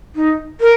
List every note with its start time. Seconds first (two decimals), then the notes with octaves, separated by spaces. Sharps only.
0.15 D#4
0.61 A#4